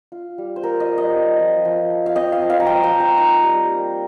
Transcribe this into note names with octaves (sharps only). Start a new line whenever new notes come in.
F4
G3
C5
F4 A#4
D#5
G3
D#5
C4
F3
F3
F3
F5
C4 D#5
F5
F3
F5
A#5
F3 G5
G5
F3
A#5
D#4 A#5
G3
A#3